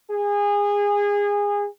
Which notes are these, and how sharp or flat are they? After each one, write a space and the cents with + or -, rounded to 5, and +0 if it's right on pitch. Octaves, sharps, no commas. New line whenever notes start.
G#4 -25